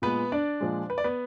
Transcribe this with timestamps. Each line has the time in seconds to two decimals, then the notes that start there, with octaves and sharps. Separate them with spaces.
0.02 A#2 G#3 B3 B4
0.32 D4 D5
0.61 A#2 F3 G#3
0.90 B4
0.98 D5
1.04 B3 B4